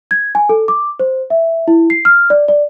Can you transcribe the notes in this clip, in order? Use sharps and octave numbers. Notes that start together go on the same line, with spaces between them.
G#6
G#5
A4
D6
C5
E5
E4
C7
F6
D5
D5